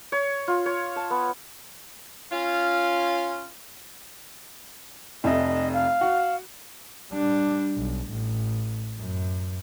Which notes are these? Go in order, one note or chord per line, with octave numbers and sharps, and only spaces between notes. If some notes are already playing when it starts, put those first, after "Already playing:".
C#5
F4
C#5
A5
B3
C#4 F4
F1 F2 D#5 E5
F5
F#4
G3 D4
B1
A1
F#2